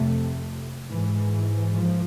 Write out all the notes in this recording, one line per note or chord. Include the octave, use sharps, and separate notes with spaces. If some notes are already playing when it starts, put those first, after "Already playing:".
Already playing: F2 C3 A3
G#2 E3
E3
F3